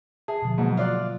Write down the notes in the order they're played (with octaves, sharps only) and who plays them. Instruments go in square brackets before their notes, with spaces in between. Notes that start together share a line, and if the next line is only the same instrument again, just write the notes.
[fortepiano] G#4 [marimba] E5 A5
[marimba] B2 D3 F3
[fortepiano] G#2 B2 [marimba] F#3 A#3
[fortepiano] F4 D5 F#6 [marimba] E5